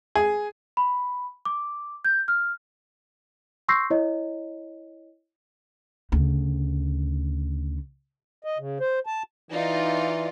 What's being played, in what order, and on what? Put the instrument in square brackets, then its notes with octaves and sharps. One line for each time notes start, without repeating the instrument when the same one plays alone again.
[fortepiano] G#4
[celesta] B5
D6
G6
F6
C6 C#6 E6 G6 A#6 C7
E4 C#5 D#5
[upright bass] D2 C#3
[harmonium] D#5
C#3
C5
A5
[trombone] E3 [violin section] D#4 F4 D5